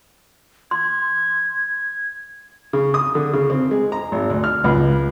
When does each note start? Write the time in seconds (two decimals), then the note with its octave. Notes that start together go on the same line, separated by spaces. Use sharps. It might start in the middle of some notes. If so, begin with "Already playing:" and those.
0.71 C6 G#6
2.73 C#3
2.94 D#6
3.15 D3
3.33 C#3
3.50 C4
3.71 G#3
3.92 A#5
4.12 G#1
4.30 D2
4.44 F6
4.64 C#2